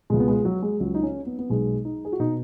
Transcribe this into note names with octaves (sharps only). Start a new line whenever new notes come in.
C#2 B2 G#3
B3
G#3
F#3
G#3
C#2 C#3 F#3
D#4
C#4
B3
B3
B1 B2 G#3
D#4
G#4
F#4
B2 D#4